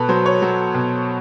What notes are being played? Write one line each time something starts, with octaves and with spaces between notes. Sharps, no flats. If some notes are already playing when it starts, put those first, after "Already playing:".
Already playing: B2 A4 B4
F#3 C5
C#5
F#3
B2